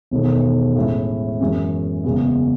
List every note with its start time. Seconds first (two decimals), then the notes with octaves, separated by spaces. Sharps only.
0.11 E1 E2 D#3 A3
0.76 A2 G#3 C#4 E4
1.40 F#2 E3 G#3 C#4
2.04 F#1 E2 C#3 G#3 B3